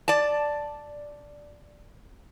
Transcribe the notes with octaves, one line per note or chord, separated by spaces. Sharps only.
D5 A5